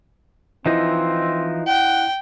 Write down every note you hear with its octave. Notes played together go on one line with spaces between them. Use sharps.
E3 F3 C4 D#4 E4 D#5
F#5 G5